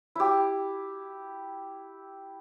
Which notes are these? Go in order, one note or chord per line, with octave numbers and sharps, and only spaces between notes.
E4 G4